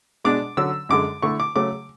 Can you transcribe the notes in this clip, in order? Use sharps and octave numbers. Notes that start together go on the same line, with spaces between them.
B2 G#3 D4 D6
D3 F#3 C#4 E6
F#2 D3 G#3 D6
D3 A3 E4 C#6
D6
C#3 F#3 A3 C#4 D6